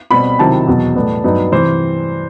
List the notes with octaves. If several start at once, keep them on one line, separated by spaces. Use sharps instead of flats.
B2 G3 C4 B5
C3 D#3 F#3 C4 E4 A5
E2 B2 F#3
A2 G3 B3
G2 F#3 B3 D#4
C3 E3 C5